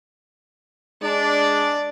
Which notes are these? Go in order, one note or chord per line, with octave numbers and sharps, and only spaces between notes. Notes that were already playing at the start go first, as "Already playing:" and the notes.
G#3 D4 D5